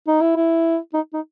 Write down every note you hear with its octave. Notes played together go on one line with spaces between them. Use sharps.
D#4
E4
E4
D#4
D#4